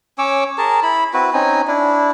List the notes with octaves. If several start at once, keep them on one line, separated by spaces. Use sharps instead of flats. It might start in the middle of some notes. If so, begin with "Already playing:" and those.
C#4 C#5 D6 E6
G#4 A#4 A5
E4 B5
C4 E4 F#4 B4
C4 C#4 D#4 G#5
D4 E4